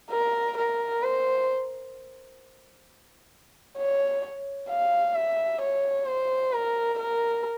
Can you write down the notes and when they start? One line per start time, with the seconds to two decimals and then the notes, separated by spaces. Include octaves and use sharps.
0.11 A#4
0.57 A#4
1.03 C5
3.78 C#5
4.70 F5
5.15 E5
5.61 C#5
6.07 C5
6.53 A#4
6.98 A#4